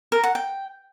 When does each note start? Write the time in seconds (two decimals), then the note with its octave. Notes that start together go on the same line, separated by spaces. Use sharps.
0.12 A#4
0.24 F#5
0.35 G5